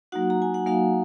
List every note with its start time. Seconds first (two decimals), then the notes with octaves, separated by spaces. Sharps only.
0.12 F#3 A#3 D#4 F#4 F#5
0.30 A#5
0.42 G#5
0.54 F#5
0.66 F#3 A#3 D#4 F#4 F5